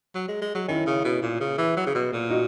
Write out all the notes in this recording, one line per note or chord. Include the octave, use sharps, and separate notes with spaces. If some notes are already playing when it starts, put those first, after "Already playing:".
F#3
G#3
G#3
F#3
D#3 C#4 E4
C#3
B2
A#2
C#3
E3
F#3
C#3
B2
A#2
D#4 F#4